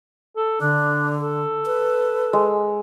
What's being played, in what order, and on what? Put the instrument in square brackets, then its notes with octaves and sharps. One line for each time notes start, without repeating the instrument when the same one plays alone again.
[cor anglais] A4
[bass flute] D3 [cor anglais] D4
[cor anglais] A4
[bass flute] B4
[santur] G#3